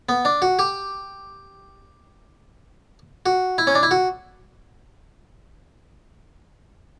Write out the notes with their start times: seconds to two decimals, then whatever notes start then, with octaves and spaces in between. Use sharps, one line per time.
0.09 B3
0.25 D4
0.42 F#4
0.59 G4
3.26 F#4
3.58 E4
3.67 C#4
3.75 D4
3.83 E4
3.91 F#4